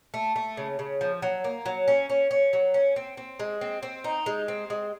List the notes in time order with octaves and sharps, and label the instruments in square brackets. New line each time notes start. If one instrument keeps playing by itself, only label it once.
[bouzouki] A3
A3
C#3
C#3
F3
F#3
A#3
F#3
C#4
C#4
C#4
F#3
C#4
C4
C4
G#3
C4
C4
D#4
G#3
C4
G#3